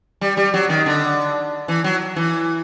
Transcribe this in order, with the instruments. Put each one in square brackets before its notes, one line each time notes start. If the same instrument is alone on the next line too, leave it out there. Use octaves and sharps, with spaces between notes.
[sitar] G3
G3
F#3
D#3
D3
E3
F#3
E3